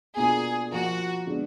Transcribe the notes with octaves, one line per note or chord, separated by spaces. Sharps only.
B2 A#3 D4 F4 G#4
F3 A#3 F4 F#4 A#4
D3 G#3 B3 D4